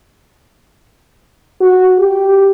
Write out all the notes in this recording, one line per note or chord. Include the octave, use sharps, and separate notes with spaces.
F#4
G4